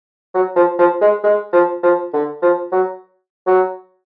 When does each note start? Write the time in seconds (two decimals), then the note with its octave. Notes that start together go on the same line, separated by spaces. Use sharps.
0.34 F#3
0.56 F3
0.78 F3
1.01 G#3
1.24 G#3
1.53 F3
1.83 F3
2.13 D3
2.42 F3
2.72 F#3
3.47 F#3